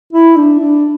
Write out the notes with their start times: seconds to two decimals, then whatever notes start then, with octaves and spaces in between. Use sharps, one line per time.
0.13 E4
0.36 D4
0.59 D4